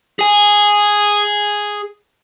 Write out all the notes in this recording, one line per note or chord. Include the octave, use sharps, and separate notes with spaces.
G#4 G#5